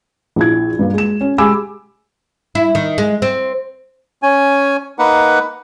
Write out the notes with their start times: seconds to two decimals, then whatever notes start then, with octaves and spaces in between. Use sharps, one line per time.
0.36 A#1 E4 G#6
0.79 G2 A#3
0.94 G#3 E7
1.21 C#4
1.38 G#3 G4 G#5 B5 D6 E6
2.55 E4
2.75 D#3
2.98 G#3
3.22 C4
4.23 C#4 G#5
4.99 A#3 D#4 B4 F#5